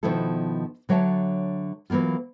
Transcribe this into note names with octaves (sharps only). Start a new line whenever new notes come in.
B2 D#3 F3 B3 E4 A4
D3 F#3 C#5 E5 A5
E3 F#3 A#3 B3 F4